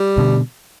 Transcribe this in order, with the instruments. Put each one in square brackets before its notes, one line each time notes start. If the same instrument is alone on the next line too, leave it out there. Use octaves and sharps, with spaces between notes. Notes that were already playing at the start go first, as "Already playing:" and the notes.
Already playing: [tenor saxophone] G3
[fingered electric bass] B2 D3